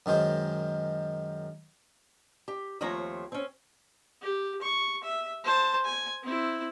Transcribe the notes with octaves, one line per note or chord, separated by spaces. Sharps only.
F#2 D#3 G#3 C5
G4
D#2 F3 A3 C4 C#5 A#5
C4 C#4
G4
C#6
E5
C5 A5
G#5
C4 E4